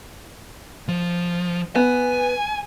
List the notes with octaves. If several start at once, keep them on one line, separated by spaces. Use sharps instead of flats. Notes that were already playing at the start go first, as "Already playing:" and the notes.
F3
B3 G#5